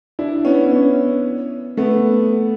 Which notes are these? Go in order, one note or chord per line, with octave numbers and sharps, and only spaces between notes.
D4 E4
B3 C#4
B3 C#4
A3 B3